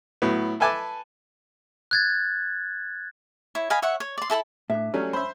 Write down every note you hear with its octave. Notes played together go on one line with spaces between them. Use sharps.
A2 F#3 B3
A4 B4 E5 G#5 A5 D6
F#6 G#6 A6
E4 C#5
D#5 F5 G#5 B5
C#5 E5 F#5 C#6
C#5
D5 C6
E4 A4 A5 B5
A2 D4 D#4 E5
F#3 G3 A3 C#4
C5 E5 B5